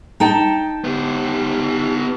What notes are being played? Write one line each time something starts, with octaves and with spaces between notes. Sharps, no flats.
D#4 G5 A5
B3 G4